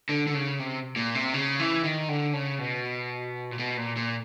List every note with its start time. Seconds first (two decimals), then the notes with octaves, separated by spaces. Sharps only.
0.09 D3
0.27 D3
0.34 C#3
0.59 C3
0.96 A#2
1.15 C3
1.34 C#3
1.59 E3
1.84 D#3
2.08 D3
2.33 C#3
2.59 B2
3.51 A#2
3.59 B2
3.77 A#2
3.96 A#2